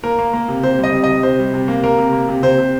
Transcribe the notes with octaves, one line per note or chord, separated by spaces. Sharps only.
A#3 A#4
A#3
A#3
C3
C3 C5
G3
D#5
C3
C3 D#5
C3 C5
G3
C3
A#3
A#3 A#4
C3
A#3
C3
C3 C5
C3